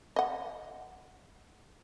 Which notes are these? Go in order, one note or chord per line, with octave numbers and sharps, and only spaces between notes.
D#5 F#5